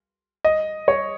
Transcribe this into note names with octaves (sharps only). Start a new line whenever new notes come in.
D#5
C#5